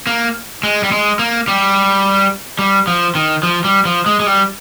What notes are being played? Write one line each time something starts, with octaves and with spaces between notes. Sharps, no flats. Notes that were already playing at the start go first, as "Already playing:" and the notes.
A#3
G#3
G3
G#3
A#3
G3
G3
F3
D#3
F3
G3
F3
G#3
G#3
G3